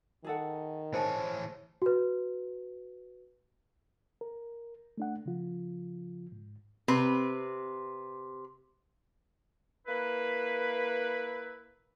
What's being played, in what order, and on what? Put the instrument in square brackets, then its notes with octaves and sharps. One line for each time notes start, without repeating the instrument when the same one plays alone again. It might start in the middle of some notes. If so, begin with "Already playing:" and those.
[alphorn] D#3 [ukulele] G#4 A4 F#5
[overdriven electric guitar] E3 C#5 [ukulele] G#4 [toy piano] C5 A5
[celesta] F#4 B4
[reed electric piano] A#4
A3 D4 F#5
C#3 F3 F4
G#2
[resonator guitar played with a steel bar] C3 C4 B4
[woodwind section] A#3 E4 B4